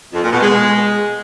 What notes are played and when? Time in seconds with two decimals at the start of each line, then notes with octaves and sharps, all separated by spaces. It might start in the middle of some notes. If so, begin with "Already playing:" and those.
0.13 F2
0.22 A#2
0.31 B2
0.41 G#3